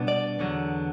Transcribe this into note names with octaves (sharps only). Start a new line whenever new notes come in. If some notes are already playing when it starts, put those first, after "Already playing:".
Already playing: B2 G3 B3 D4
D5
E2 D3 F#3 B3